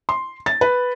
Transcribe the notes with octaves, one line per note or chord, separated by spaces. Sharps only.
C6
A6
B4